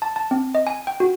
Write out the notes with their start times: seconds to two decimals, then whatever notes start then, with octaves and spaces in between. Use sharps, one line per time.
0.02 A5
0.16 A5
0.31 C4
0.55 D#5
0.67 G#5
0.87 G5
1.00 F#4